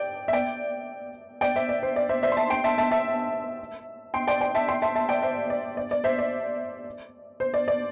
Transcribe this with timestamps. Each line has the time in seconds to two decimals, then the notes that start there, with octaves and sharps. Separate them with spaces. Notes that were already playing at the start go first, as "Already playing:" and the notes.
Already playing: D5 G5
0.28 E5
0.33 D5 G5
1.41 D5 G5
1.55 C5 E5
1.69 D5
1.83 C5
1.96 D5
2.09 C5 E5
2.23 C5 E5
2.32 C6
2.37 E5 A5
2.50 G5 C6
2.64 E5 A5
2.78 E5 A5
2.91 E5 A5
4.14 G5 C6
4.27 D5 G5
4.40 D5 G5
4.55 E5 A5
4.68 G5 C6
4.82 E5 A5
4.95 E5 A5
5.09 D5 G5
5.22 C5 E5
5.50 D5
5.77 D5
5.91 D5
6.04 C5 E5
6.19 D5
7.40 C5
7.54 D5
7.68 D5